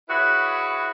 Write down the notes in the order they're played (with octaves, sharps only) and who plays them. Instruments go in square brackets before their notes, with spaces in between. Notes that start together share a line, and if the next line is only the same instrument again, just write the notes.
[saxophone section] E4 F#4 G#4 B4 C#5 E5